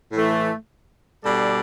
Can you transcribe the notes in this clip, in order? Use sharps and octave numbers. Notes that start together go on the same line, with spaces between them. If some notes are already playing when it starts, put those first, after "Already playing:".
A2 E3 A3
B2 G3 D4 A4 D5